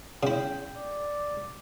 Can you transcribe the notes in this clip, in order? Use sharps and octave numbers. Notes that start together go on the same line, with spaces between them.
C#3 E4 G5
D5